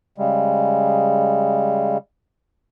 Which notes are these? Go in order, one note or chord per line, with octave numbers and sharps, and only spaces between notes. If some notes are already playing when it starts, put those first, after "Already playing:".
C#3 G3 G#3